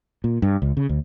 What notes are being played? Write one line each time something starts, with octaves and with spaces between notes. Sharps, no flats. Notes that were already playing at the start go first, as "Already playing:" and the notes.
A#2
G2
C#2
C#3
D2